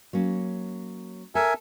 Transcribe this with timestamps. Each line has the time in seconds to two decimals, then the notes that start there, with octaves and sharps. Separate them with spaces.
0.13 F#3 A#3 C#4
1.35 A4 A#4 E5 G#5